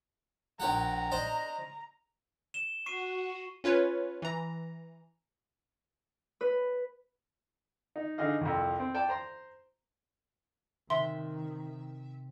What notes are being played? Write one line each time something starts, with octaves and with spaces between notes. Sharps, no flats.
A#1 G4 F#5 A#5
D4 C5 D#5
E7 G7
F#4 C#6 C7 D#7
C#4 F4 B4 C#5
E3 A#5
B4
D#4
D3 D#4 G#4 D#5 F5
C2 F2
C4
D5 G5 A5
C5 A#5 C6
C3 D#3 E5 C6